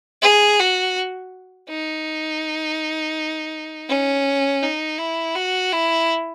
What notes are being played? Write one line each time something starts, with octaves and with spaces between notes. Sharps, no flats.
G#4
F#4
D#4
C#4
D#4
E4
F#4
E4